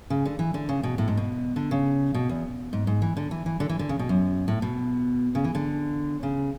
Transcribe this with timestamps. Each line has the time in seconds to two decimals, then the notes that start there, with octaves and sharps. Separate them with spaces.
0.10 C#3
0.25 D3
0.39 E3
0.54 D3
0.69 C#3
0.83 B2
0.98 A2
1.08 G#2
1.17 B2
1.56 D3
1.71 C#3
2.14 B2
2.29 E2
2.73 G#2
2.87 G#2
3.02 E3
3.17 D3
3.31 E3
3.46 E3
3.60 D3
3.69 E3
3.79 D3
3.89 C#3
3.99 B2
4.09 F#2
4.48 A2
4.62 B2
5.35 C#3
5.44 E3
5.55 D3
6.23 C#3